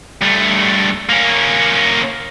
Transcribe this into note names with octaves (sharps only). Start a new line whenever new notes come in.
G2 A3
A#3 C#4